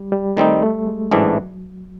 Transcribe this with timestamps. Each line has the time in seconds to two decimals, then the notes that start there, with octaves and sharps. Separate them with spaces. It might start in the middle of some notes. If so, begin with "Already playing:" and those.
Already playing: G3
0.12 G3
0.36 D#3 G3 A3 C4 D#4
0.62 A3
0.87 G#3
1.11 A1 G#2 E3 F#3 A3 D4